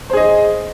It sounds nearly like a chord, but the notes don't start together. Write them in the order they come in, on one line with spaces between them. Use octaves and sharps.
C5 G#4 D#5